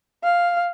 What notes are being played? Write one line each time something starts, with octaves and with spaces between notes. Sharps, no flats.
F5